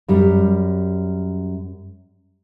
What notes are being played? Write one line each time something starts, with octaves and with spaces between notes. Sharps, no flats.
F#2 G3